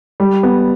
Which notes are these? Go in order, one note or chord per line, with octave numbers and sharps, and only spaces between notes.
G3
B3